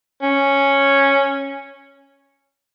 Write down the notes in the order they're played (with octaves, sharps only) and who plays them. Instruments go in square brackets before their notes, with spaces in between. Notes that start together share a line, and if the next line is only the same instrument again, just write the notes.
[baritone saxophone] C#4